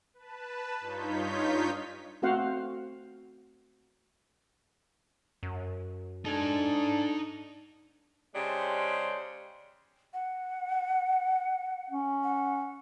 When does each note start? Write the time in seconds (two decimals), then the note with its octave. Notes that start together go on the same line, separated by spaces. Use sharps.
0.14 B4 A5
0.80 G2 D#4 F4 C#5 G6 B6
2.22 A3 C4 F#4 C5 F5 F#5
5.43 F#2
6.25 D4 D#4 A4 G#5
8.35 C#3 G#3 D4 G4 C5
10.13 F#5
11.90 C#4
12.24 F#5